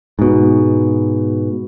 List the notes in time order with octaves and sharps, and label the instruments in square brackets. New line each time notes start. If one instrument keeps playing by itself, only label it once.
[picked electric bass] G#2 B2